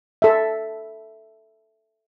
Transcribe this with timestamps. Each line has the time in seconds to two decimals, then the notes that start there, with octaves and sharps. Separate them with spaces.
0.22 A4 E5